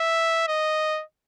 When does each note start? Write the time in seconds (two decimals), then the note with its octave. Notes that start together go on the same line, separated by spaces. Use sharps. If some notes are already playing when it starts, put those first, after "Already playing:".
Already playing: E5
0.48 D#5